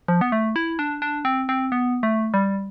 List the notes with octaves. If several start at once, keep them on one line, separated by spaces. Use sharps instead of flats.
F3
B3
A3
E4
D4
D4
C4
C4
B3
A3
G3